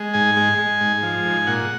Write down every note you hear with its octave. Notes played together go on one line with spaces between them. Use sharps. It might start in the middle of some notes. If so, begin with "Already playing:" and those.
Already playing: G#3
G#2 G#5
G#3
G#3
G#2
F3
G#2
A#2 F#5